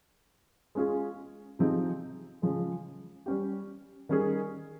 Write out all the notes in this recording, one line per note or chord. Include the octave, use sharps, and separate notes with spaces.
G#3 C#4 F4 G#4
C3 F3 C4 D#4 G#4
C#3 F3 G#3
G3 C#4 G4
D#3 G3 C#4 G#4